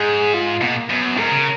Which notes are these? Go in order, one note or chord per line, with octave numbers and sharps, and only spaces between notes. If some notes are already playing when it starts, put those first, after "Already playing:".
Already playing: G#2 G#4
F4
B2 A#3
F#2 B3
G#2 A#4
C#3